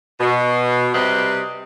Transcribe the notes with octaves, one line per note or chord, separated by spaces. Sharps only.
B2
C3 G3 C4 B4 D#5